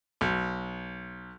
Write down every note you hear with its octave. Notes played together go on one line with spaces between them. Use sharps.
B1